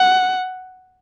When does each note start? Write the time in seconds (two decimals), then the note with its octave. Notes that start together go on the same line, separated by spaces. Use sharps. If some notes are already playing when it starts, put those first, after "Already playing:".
Already playing: F#5